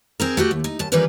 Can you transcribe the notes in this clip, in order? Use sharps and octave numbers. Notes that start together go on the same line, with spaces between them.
C4 G#4 A#4
A3 F#4 G4
D#2
D#4
F#2 A5
E3 F3 G3 C#4 A#4 B4